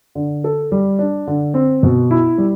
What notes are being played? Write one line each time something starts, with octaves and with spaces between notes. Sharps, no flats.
D3
A4
G3
D4
D3
C4
B2
E4
G3